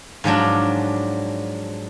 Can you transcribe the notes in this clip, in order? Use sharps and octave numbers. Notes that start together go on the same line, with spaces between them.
G#2 F3 F#3 D4